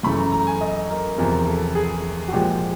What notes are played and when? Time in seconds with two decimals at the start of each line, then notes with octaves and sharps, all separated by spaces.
0.03 F#2 C#3 E3 A3 B5
0.18 A#5
0.32 A#5
0.47 G#5
0.61 D#5
0.90 A#4
1.18 E2 C3 F3 A#4
1.47 A4
1.75 G#4
2.28 F#4
2.33 A#2 F3 G#3 G4